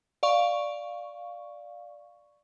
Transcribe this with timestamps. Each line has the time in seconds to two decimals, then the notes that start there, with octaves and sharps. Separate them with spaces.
0.23 D5 F5 C#6